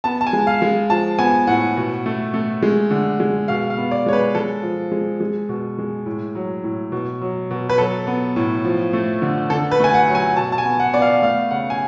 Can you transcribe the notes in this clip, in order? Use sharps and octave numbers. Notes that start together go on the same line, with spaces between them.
B3 A5
A5
G#5
G#3
F5
G#3
F3 A5
B3 G#5
A2 F#5
B2
A3
A3
G#3
D3
G#3
B2 F5
F5
B3
D5
G#3 C#5
B4
G#3 A4
F3
G#3
G#3
B2
G#3
A2
F#3
A2
B2
F#3
B2
B4
F#3 A4
B3
A2
F3
A3
D3
D3 A4
B4
A3 G#5
F#5
F#3
G#5
B2 A5
A5
G#5
B3
F#5
B3 D5
F5
A3 F5
C#3 F#5
G#5